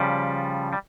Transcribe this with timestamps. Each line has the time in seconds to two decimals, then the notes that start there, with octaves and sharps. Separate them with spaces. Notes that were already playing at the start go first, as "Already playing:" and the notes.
Already playing: C#3 F3 G3
0.73 G3